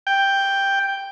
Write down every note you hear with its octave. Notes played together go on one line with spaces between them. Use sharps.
G5